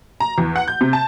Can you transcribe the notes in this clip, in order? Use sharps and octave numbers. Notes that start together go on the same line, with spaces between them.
A#5
E2
F#5
G6
C3
A5